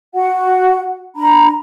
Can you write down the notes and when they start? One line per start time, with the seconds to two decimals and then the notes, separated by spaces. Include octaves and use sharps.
0.14 F#4 F#5
1.16 D4 A#5 B5